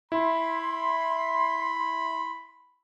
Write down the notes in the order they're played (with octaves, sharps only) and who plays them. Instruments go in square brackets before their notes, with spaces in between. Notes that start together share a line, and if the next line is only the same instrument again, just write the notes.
[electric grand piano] E4 [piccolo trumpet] B5 [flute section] C6